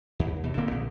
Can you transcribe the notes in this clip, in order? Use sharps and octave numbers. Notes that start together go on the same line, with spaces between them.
D#2
D#2 B2
D1 D3 A#3 C4
A#1